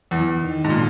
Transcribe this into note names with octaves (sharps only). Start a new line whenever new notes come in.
E2
D#3
G#2
A#2